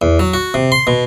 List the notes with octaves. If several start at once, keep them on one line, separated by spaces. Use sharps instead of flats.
E2
F#3
F#4
C3
C6
B2